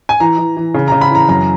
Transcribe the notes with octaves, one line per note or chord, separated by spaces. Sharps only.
G#5
E3 A#5
E3
E3
C#3
A#5
C#3
B5
E3 A#5
F#2 A#5